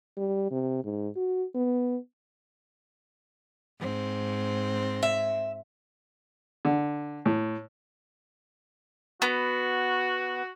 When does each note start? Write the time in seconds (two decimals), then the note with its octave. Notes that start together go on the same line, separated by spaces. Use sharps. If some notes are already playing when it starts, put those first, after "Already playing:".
0.17 G3
0.51 C3
0.85 G#2
1.16 F#4
1.55 B3
3.78 G#2 C4
5.03 E5
6.65 D3
7.26 A2
9.22 B3 F#4